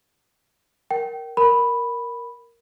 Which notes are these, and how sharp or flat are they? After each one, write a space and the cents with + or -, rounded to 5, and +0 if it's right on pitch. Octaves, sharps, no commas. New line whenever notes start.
A#4 +0 G5 -25
A#4 +0 B5 +0